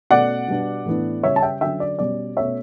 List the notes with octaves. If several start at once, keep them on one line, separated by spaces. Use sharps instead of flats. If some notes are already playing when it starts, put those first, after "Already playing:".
B2 A3 C#4 D5 F#5
B2 G3 B3 D4
A2 E3 B3 D4
C#3 G3 C#4 C#5 E5
A5
E5 G5
D3 F#3 C#4 E5 G5
D5
B2 G3 C#4 D5
B2 A3 C#4 C#5 E5